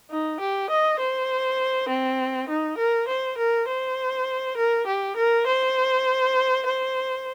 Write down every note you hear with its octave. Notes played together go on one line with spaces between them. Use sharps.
D#4
G4
D#5
C5
C4
D#4
A#4
C5
A#4
C5
A#4
G4
A#4
C5
C5